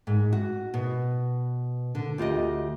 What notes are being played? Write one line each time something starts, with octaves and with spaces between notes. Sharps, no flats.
G#2
F#4
B2
D3
D2 F4 G4 D#5